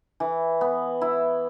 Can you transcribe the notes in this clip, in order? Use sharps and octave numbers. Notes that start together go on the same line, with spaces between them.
E3
B3
E4